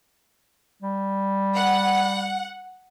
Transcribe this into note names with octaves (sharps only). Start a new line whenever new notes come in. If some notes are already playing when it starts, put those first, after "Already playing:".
G3
F#5